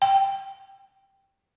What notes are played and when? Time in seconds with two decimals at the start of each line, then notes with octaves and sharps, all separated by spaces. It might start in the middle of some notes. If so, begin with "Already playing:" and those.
0.02 G5